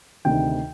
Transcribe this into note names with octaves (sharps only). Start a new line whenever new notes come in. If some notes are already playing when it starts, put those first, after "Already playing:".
D2 C3 D#3 G5